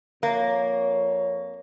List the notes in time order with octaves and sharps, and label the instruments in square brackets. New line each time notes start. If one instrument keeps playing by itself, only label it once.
[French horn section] F2 A#4 C#5 [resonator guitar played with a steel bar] A#3